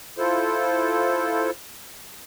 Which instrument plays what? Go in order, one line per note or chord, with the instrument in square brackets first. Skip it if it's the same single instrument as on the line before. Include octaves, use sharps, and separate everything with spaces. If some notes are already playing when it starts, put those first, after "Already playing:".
[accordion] E4 F4 A4 C5